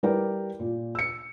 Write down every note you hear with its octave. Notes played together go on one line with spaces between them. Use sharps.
G3 E4 A#4 B4 D5 G5
A#2
E6 C#7